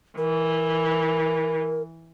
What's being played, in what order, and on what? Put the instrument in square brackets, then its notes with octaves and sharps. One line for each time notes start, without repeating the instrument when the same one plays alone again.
[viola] E3 [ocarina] A#4